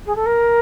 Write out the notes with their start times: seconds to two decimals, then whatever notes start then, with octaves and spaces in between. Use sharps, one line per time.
0.06 G#4
0.15 A4
0.26 A#4